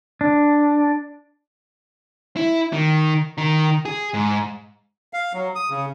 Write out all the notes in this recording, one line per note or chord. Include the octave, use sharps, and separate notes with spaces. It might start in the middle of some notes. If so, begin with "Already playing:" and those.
D4
E4
D#3
D#3
G#4
G#2
F5
F#3
D#6
C#3